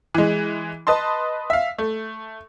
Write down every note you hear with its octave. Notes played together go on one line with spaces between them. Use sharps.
E3 G#3
B4 D#5 A5 C6
E5 F5
A3